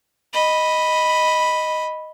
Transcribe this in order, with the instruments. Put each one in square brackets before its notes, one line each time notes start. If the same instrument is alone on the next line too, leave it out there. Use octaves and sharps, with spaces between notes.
[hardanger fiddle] D#5 B5